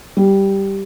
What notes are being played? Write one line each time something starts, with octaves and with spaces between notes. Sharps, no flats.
G3